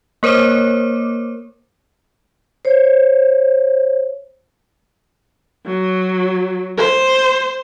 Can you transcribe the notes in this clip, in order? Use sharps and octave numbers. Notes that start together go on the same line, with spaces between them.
A#3 A#4 C5 C#5 D6
C5 C#5
F#3
C5